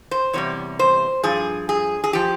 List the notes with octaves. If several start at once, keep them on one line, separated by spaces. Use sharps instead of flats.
C5
E2 C3 G3 C#5
C5
G2 F3 G#4
G#4
G#4
F3 G4